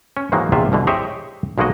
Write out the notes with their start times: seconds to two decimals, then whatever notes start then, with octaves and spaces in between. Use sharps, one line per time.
0.17 C#4
0.32 G#2 D#3 E3 F#3 G#3 A#3
0.52 A#1 E2 C3 F4 E5
0.72 C2 B2 D3 E3
0.87 G4 G#4 C5 C#5 D#5 E5
1.58 B1 G#3 A#3 F#4 D#5